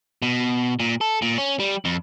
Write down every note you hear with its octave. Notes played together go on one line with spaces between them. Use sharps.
B2
A#2
A4
A#2
C#4
G3
F2